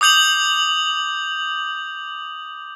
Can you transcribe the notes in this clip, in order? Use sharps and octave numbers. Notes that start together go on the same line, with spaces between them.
D6 D#6 G6 F7 F#7